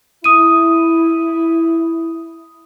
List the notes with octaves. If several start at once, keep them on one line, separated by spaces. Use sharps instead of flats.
E4 D#6 D#7